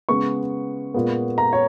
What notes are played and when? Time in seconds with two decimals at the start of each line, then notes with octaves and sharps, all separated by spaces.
0.09 C#3 G#3 B3 C#6
0.94 A#2 G#3 B3
1.38 A#5
1.53 C#5